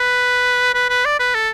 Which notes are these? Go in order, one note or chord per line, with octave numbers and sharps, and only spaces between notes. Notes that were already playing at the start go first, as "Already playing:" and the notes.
Already playing: B4
B4
B4
D5
B4
A4